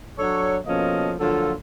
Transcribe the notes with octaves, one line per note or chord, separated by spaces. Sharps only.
F#3 D4 A4 C#5
B2 F3 A#3 C#4 A4 D#5
D3 F3 F#3 A#3 F4 A4